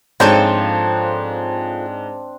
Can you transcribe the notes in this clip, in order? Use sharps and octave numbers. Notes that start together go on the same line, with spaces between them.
G#2 F3 C4 D4 A4 C#5 G5